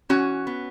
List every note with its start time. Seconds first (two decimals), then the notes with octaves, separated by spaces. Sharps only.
0.09 E3 C#4 F#4
0.47 B3